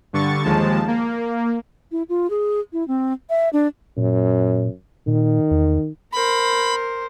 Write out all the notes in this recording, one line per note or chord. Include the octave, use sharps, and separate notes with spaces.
G2 D3 C#6 A6
D#2 F3 G#3 A5
A#3
E4
F4
G#4
E4
C4
E5
D4
F#2 A#2
A#2 D#3
E2
A#4 C5 B5